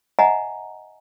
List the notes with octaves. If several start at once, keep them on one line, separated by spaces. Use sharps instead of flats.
D#5 E5 F#5 G#5 A#5